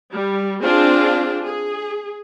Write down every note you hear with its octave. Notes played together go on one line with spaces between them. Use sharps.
G3
C4 D4 F4 G#4
G#4